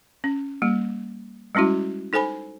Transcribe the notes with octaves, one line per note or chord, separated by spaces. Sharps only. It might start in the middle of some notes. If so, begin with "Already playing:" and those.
C#4
G3 A#3
G3 G#3 C#4 E4 F#4
D#4 A4 C5 G#5 B5